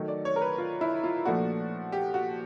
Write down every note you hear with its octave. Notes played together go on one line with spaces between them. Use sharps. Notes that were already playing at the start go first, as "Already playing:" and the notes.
Already playing: D#3 F#3 A3
D5
C#5
A#4
B4
F4
E4
F4
A#2 F3 A3 D4 F#4
G4
F#4